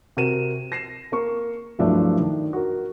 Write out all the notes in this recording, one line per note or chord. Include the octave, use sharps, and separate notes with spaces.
C3 F#4 A#4 D#7 E7
A#6 C7 E7
A#3 A#4 C#6
G2 F3 F#3 A3 D4 E4
D#3
F#4 A#4